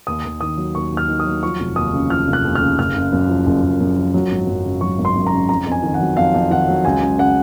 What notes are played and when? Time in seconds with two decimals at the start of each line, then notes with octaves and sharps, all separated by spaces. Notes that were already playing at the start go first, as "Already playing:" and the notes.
0.07 D#2 D#6
0.25 D#2
0.41 D#3 D#6
0.57 F#3
0.75 D#2 C#6
0.92 D#2
0.97 F6
1.09 D#3
1.20 D#6
1.26 F#3
1.43 F3 C#6
1.60 F1
1.76 D#2 D#6
1.93 C#3
2.10 F3 F6
2.27 F1
2.33 F#6
2.45 D#2
2.55 F6
2.61 C#3
2.79 F#1 F6
2.95 F#1
3.12 F#2
3.29 F3
3.47 F#1
3.63 F#1
3.80 F#2
3.97 F3
4.14 F#3
4.31 G#1
4.47 F#2
4.64 C#3
4.81 F#3 C#6
4.98 G#1
5.05 C6
5.16 F#2
5.27 A#5
5.32 C#3
5.49 F2 A#5
5.66 F2
5.72 G#5
5.83 D#3
5.94 F#5
6.00 F#3
6.16 F2 F5
6.34 F2
6.51 D#3 F#5
6.68 F#3
6.85 C#2 G#5
7.02 C#2
7.18 C#3 F#5